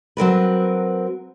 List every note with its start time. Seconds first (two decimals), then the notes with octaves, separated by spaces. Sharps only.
0.17 F#3 C4 A#4 B4